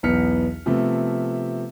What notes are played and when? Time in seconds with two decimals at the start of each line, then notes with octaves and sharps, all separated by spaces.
0.03 B1 E2 B3 F6 B6 C#7
0.66 C3 F3 A3 B3